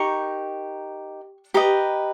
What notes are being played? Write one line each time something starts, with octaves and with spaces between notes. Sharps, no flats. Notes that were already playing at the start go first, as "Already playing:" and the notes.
Already playing: D#4 G4 A#4 C#6
G4 B4 D#5 A#5